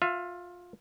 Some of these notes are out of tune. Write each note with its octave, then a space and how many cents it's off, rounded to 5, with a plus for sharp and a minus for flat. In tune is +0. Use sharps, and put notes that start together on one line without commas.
F4 +20 E5 +40